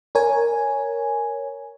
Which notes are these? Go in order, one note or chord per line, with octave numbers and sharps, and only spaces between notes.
A#4 C#5 G#5